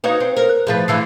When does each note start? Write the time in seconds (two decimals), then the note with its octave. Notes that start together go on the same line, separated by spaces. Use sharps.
0.04 D#4 F#4 B4 C#5 F5
0.20 C4
0.37 A#4
0.49 F#6
0.67 A2 F3 G#4 B4 A6
0.88 A2 D3 E3 F5 E6 C7